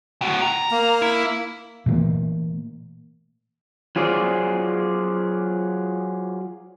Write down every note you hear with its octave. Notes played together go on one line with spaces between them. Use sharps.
A2 F#4
A#5
A#3
E4
A#2 E3 A3 A#3
F#3 F4 G#4 C5 D5